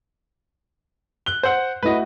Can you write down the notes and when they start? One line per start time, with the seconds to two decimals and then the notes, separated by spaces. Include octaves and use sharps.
1.26 F#6 G7
1.43 C5 F#5
1.83 A3 E4 F#4 B4 D#5